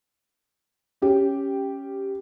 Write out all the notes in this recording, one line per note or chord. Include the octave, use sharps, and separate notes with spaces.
C#4 G4